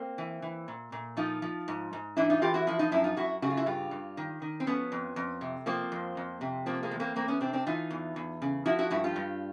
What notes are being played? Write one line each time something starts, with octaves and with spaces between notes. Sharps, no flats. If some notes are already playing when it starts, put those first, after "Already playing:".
Already playing: A#3 C4
E3
E3
A#2
A#2
F3 D#4 F4
F3
G#2
G#2
E3 D4 E4
D#4 F4
E3 F4 G4
E4 F#4
F3 E4 F#4
D#4 F4
F#2 D4 E4
D#4 F4
F#2 E4 F#4
C#3 F#4
F4
E4 F#4
G2 F4 G4
G2
D#3
D#3
C4
F3 B3 C#4
F2
F2
C3
F3 A#3 C4
F2
F2
C3
F3 A#3 C4
G#3 A#3
E2
A#3 C4
E2 A#3 C4
B3 C#4
C3 C4 D4
C4 D4
E3 D#4 F4
E2
E2
C#3
F3 E4 F#4
E4 F#4
G2 E4 F#4
F4 G4
G2